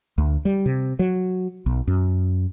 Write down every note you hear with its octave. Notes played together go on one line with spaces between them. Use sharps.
D2
G3
C3
F#3
B1
F#2